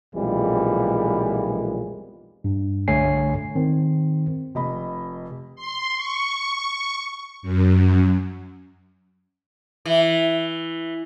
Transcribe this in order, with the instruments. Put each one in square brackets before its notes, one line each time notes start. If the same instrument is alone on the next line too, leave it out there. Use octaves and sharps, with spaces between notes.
[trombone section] B1 F2 A#2 E3 G3 G#3
[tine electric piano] G2
C2 D3 A3 C#5 G#5 C7
D#3 C4
[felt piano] F1 D#5 B5
[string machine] C6
C#6
F#2
[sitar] E3